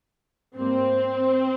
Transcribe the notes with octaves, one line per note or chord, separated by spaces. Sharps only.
G#2 G3 A#3 C4